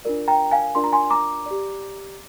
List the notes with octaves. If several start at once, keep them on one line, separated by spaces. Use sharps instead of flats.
D4 F4 A#4 D5
G5 A#5
F5 G#5
D4 F4 A#4 D5 C6
A#5
G#5 C6
A#5 D6
G4 D5